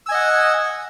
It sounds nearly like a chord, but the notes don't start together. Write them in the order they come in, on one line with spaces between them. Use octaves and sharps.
E6 G#5 D#5 F#5